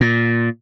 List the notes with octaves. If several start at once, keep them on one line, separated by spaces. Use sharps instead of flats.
A#2